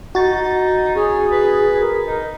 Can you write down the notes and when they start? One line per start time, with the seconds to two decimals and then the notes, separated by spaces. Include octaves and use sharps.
0.15 D#4 F#4 A6
0.95 C#4 G#4
1.31 B4
1.80 A#4
2.07 D#4